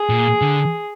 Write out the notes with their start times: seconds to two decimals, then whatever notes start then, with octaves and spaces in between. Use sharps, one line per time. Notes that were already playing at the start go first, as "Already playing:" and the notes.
Already playing: G#4
0.09 A#2
0.41 D3